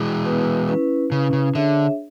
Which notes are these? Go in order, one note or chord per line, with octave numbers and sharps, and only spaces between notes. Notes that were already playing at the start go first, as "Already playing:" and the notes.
Already playing: E3 G#3
B3 E4 B4
C#4 E4 B4
C#3 C#4 E4 B4
C#3
D3 D4 G#4 C#5 E5